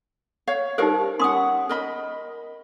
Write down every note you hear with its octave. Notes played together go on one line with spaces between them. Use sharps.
C#5 F5
D#4 G4 A#4 C5 F5
C#4 F#5 C6 D#6
A#4 D#5 B5